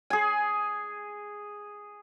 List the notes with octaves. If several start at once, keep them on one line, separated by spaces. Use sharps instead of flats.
G#4 G#5